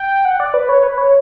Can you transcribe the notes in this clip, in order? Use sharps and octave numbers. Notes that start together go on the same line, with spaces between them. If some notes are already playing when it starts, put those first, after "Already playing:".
Already playing: G5
F#5
D5
B4
C#5
B4
C#5